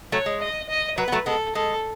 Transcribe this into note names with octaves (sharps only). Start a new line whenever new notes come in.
F#3 A3 C#5
G#3
D#5
D#5
F#3 B4
B3
F#3 A3
G#3 B3 A4
G#3 A4